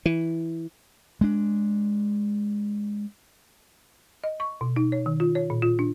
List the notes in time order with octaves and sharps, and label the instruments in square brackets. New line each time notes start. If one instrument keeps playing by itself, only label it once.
[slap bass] E3
G#3 D4
[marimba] D#5
C#6
B2
D#4
C#5
D#3
F4
C#5
A#2
F4
D4